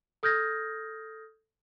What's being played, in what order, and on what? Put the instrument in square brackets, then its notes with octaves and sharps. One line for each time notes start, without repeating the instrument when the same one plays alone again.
[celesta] A4 D#6 F6 G6 G#6 A#6